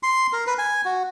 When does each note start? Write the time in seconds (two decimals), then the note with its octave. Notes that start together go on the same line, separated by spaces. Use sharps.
0.03 C6
0.33 A#4
0.47 B4
0.58 G#5
0.85 F#4